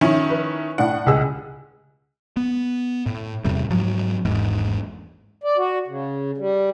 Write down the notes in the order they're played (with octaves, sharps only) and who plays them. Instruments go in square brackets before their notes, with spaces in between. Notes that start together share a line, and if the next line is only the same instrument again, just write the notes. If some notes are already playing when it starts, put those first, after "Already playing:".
[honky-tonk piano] D#3 C#4 E4 [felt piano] F3
[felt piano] B4
[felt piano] A2 D4 [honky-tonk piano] F#5
[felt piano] C#2 G#4 E6
[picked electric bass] B3
A2
E2 A2 C3 G3
G#2 F3 F#3
G#1 E2 G#2
[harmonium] D5
F#4
C#3
G3